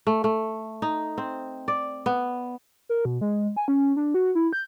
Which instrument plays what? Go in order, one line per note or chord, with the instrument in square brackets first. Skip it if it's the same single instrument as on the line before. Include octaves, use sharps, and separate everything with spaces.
[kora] A3
A3
D#4
C4
D5
B3
[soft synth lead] A#4
B2
G#3
G#5
C#4
D4
F#4
E4
G6